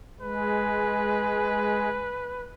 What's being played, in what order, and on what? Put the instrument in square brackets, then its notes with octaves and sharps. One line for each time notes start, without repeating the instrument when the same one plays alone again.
[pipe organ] G#3 [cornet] B4